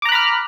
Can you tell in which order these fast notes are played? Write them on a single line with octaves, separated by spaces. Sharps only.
D6 A#5 F#6 B5 F6